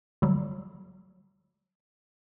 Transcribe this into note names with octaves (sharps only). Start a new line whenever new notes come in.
D3 F#3 G3